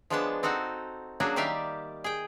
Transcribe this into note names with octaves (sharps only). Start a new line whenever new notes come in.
F3 G#3 B3 D4 C#5 A5
C4 D#4 F#4 A4 F#5
F#3 A#3 C#4 D4 F#4 G#4
D#3 G3 G4 D5 E5 F5
G#4 G5